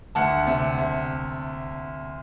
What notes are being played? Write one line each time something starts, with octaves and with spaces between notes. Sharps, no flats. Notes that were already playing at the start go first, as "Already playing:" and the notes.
D2 F#5 A5
C3
C3